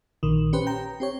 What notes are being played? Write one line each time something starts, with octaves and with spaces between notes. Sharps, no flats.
A#1 D#3
C#4 G4 B4 C5
G5 A#5
C4 G4 C#5